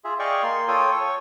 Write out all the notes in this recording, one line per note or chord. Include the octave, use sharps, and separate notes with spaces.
F4 G#4 E5
G#4 D5 D#5 F5 G5 C#6
A#3 C6
F4 A4 C#5 G5 D#6
C#5 C#6